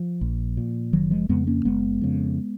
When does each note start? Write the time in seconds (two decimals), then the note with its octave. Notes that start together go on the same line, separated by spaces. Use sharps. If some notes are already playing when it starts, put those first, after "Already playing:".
Already playing: F3
0.21 A#1
0.57 A#2
0.93 F#1 D#3 F#3
1.11 F3 G#3
1.29 F2 C#3 G#3 B3
1.47 A#3 C#4
1.65 F#1 G#3 B3
2.01 F2 C#3